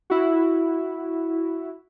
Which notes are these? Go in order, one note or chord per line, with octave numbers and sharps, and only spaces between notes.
E4 F#4